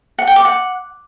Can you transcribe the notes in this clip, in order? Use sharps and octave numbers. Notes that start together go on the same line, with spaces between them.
F#5
G5
D6
F#5